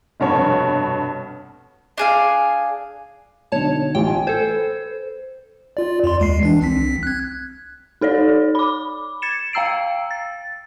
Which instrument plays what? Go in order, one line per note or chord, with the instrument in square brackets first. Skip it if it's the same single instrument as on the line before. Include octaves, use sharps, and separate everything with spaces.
[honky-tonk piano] F1 G2 B2 C#5
[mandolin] D4 G#4 F5
[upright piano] B1 D3 [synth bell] C#5 A5
[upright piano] A1 F4 G#5 [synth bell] G5
[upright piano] G#5
[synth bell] A4 C5 [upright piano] G#6
[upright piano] B4
[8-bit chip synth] F4 D5
F2 D5 C6
D#2 G#3 C7
E3 D4
C2 C4 B6
F#6 G#6
[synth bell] D#4 A4 C#5 D5
B5 D6
G#6 A6 C#7 E7
F5 G5 A#5 E6 C7 D7
A6